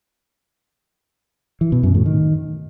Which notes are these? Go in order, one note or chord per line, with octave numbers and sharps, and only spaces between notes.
E3
B2
F#2
A2
D#3